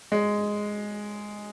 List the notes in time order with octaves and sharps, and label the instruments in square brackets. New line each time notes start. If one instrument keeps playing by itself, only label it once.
[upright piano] G#3